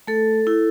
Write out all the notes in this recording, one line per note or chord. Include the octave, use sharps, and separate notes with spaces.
A3 A4
E4